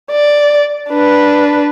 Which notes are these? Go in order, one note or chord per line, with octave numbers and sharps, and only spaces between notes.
D5
D4 B4